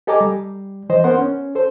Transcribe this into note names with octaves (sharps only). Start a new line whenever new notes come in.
G4 A4 D#5 G#5 A#5 D6
G3
E3 C5 D#5
B3 A#4 C5 F#5 C6
C#4
A4 C5